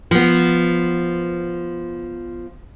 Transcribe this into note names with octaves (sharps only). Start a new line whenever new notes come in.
F3 B3